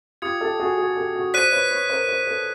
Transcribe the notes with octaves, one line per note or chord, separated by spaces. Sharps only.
F4 G4 D#6 G#6 C#7
G4 A4
F#4 G#4
F#4 G#4
G4 A4
F#4 G#4
C5 D5 F#6 B6 D#7
B4 C#5
B4 C#5
A#4 C5
A#4 C5
A4 B4